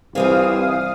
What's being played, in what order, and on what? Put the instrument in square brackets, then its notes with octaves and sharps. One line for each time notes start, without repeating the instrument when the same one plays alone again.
[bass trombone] C2 [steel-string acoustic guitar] E3 C4 F4 [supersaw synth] F5 D#6